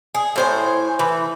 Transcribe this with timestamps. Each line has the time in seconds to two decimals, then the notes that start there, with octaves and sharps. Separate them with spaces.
0.15 G#4
0.36 A2 C5 G#5
0.99 E3